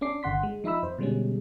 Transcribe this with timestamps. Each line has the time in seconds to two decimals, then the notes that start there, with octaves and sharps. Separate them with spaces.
0.01 C#4 D4 D6 C7
0.23 G1 D3 F#5 C6 B6
0.43 G#3
0.64 F3 D#4 E5 B5 E6
0.83 F2 C5
0.98 B2 D3 G3 G#3 C#4